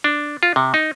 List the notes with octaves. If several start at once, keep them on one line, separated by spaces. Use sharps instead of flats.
D4
F4
C3
D#4